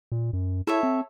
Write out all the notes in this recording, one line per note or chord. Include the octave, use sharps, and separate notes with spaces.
A#2
F#2
E4 A4 C#5 E5
C4